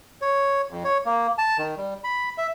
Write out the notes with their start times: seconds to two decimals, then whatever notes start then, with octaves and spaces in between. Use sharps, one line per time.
0.21 C#5
0.71 F2
0.84 C#5
1.05 A#3
1.38 A5
1.58 D#3
1.77 G3
2.04 B5
2.38 E5